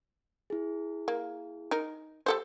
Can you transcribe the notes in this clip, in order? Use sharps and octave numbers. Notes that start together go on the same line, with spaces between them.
E4 G#4
A#3
D#4 A#4
G3 A4 C5